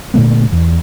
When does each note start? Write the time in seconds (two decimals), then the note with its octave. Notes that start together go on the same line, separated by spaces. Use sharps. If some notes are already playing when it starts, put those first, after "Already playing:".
0.14 A#2 D3 A3 B3
0.52 E2